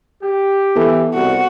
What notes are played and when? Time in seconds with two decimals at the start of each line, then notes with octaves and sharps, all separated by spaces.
0.22 G4
0.76 E3 B3 A4
1.14 C2 F#4